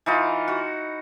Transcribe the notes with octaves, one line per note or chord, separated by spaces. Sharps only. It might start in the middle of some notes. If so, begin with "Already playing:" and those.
E3 D#4 F4
F#4